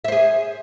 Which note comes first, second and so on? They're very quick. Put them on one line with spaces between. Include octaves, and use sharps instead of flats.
E5 C5 G#4